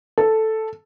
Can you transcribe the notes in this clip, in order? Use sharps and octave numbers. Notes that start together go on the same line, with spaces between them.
A4